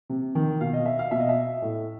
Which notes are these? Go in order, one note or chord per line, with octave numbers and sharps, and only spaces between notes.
C3
D#3
B2 F5
D#5
E5
F5
B2 E5
D#5
E5
A2